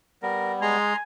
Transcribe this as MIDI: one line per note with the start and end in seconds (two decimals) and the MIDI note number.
0.22 0.77 55
0.22 0.77 59
0.22 0.53 70
0.62 0.93 56
0.62 1.03 80
0.62 0.96 82
0.62 0.96 84